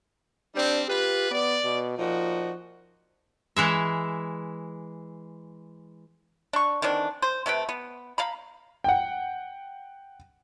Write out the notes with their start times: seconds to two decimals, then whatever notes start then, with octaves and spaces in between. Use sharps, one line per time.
0.55 G3 C4 D4
0.88 F4 G4 B4
1.31 B3 D5
1.64 B2
1.98 A#2 F3 D#4 F#4
3.56 E3 G#3 E5
6.53 D4 C#6
6.82 D#3 E3 C4 D4
7.22 C5
7.46 C3 A3 B4 G5
7.69 B3
8.18 F5 A#5 B5
8.84 F#5 G5